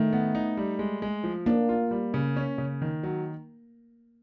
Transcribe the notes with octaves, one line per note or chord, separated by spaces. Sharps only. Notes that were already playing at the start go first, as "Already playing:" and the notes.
Already playing: D#3 A3
B3
D#4
G3
G#3
G#3
F3
A#3 D4
F4
G3
C#3
C#4
C#3
D#3
F#3